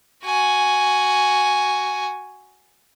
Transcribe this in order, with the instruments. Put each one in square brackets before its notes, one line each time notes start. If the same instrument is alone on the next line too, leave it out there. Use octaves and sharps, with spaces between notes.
[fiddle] F#4 G#5